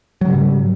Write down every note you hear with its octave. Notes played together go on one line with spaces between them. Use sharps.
G#2 C#3 F#3 G3